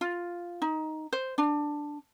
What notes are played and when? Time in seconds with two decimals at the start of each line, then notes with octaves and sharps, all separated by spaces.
0.01 F4
0.62 D#4
1.13 C5
1.38 D4